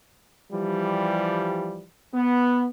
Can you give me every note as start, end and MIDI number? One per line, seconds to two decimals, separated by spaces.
0.53 1.85 52
0.53 1.85 53
0.53 1.85 55
2.14 2.67 59